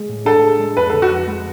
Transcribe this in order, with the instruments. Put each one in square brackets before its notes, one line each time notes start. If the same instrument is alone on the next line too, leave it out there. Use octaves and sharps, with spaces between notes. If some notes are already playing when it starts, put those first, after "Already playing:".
Already playing: [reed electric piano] G#3 G#4
A2
[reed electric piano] D4 [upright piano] A4
[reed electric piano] G#4
G#3
[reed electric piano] F2 [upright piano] B4
[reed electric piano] D3 [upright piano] A4
[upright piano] F#4
[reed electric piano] F2
G#3